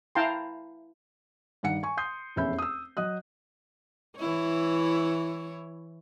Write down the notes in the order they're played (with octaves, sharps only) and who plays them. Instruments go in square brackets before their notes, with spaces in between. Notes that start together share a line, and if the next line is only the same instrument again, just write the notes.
[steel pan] E4 F5 G5 A5 A#5 C6
[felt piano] G2 D#3 F#5 C#7
G#5 C#6
C6 D#6 G6 C7
F1 E2 C#4 E5 B5 G6
D#6 E6
F#3 D#5 D#6 F#6
[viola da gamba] E3 E4 C#5